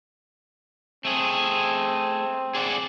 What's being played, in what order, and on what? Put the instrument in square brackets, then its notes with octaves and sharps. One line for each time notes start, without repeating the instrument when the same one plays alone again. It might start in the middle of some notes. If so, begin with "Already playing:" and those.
[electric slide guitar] A3 G#4 [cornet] C4
[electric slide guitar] G#4 D5 F#5